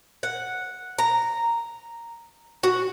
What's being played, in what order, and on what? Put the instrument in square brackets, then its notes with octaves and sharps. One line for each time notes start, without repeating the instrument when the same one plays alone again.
[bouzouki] F#5
A#5
F#4